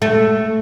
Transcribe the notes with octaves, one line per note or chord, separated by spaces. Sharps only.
A3